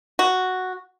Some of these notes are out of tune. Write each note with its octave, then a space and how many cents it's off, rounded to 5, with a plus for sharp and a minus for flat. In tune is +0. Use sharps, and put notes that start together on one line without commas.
F#4 +0